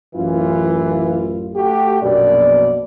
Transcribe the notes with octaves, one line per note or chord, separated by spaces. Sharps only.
A1 F#2 E3 F4
A3 F#4 G4
A#1 F#2 B2 D5